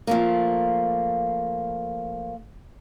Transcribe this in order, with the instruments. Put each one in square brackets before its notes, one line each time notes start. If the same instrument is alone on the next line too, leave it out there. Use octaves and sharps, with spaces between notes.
[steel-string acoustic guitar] F3 A3 A#3